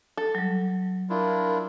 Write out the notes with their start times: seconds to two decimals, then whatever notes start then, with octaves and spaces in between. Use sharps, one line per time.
0.17 A4
0.35 F#3 G3
1.10 D4 E4 F4 A#4